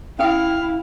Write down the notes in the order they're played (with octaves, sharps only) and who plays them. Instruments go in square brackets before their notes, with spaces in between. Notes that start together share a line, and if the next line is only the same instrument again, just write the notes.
[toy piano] C#4 A4 G5 [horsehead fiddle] E4 [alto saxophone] F5